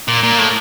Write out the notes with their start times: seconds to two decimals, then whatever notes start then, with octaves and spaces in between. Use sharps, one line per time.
0.08 A#2
0.23 A#2
0.39 A2